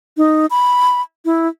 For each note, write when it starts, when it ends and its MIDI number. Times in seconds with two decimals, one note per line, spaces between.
0.17 0.46 63
0.50 1.01 83
1.25 1.48 64